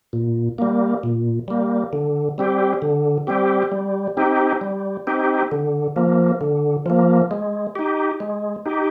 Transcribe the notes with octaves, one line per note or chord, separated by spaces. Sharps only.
A#2
G3 A#3
A#2
G3 A#3
D3
G3 C4 G4
D3
G3 C4 G4
G3
C4 D#4 G4
G3
C4 D#4 G4
D3
F3 A#3
D3
F3 A#3
G#3
D#4 G4
G#3
D#4 G4